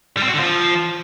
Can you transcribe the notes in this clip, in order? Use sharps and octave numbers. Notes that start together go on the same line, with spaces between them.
G3
C4
F#4
D3
F3